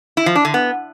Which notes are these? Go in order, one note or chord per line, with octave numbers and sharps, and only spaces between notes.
E4
F3
D4
D3
B3